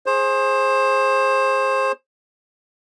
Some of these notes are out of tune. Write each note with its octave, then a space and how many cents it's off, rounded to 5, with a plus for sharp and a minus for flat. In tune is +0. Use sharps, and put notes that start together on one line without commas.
G#4 +0 C5 +25